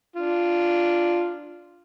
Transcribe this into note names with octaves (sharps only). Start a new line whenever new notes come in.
D4 F4